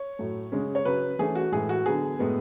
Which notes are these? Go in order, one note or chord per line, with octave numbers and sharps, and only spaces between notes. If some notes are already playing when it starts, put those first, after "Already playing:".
Already playing: C#5
A2 F#3 A3
C#3 G#3 C#4
C#5
C#3 F#3 C#4 B4
E3 A3 C#4 G#4
F#4
A2 E3 G#3 G#4
F#4
D3 F#3 B3 G#4
A2 G#3 B3